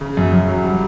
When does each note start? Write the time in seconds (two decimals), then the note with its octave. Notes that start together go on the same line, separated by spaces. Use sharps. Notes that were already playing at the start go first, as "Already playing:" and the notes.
0.01 C#3
0.17 F#2
0.32 F#2
0.48 F#3
0.64 G3